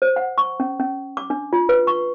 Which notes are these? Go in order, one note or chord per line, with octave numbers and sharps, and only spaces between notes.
C5
F#5
C#6
C#4
C#4
D6
D4
F4
B4
C#6